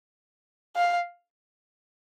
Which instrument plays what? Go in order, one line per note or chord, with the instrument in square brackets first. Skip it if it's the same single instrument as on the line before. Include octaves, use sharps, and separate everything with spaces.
[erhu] F5